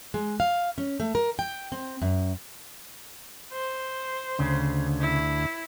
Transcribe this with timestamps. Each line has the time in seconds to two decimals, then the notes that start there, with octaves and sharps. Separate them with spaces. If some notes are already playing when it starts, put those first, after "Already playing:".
0.14 G#3
0.40 F5
0.78 C#4
1.00 A3
1.15 A#4
1.39 G5
1.72 C4
2.02 F#2
3.53 C5
4.39 D2 C#3
5.01 E4